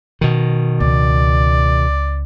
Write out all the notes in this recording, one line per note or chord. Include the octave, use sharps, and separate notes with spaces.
B2 D#3
C#2 D5